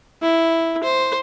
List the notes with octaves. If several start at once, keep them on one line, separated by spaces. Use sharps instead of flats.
E4
C5